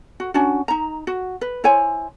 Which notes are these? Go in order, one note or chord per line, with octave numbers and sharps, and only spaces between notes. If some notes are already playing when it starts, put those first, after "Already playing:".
F#4
C#4 D4 F#4
D#4 A#5
F#4
B4
E4 C5 C#5 G#5